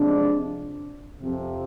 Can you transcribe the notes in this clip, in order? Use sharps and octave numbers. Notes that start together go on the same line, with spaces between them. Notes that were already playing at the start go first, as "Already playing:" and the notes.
Already playing: C3 F3 G#3 D4
F2 C3 F3